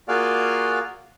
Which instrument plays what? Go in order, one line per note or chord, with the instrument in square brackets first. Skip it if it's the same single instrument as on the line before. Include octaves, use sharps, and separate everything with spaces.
[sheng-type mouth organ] A#3 F4 F#4 G#4 D5 F5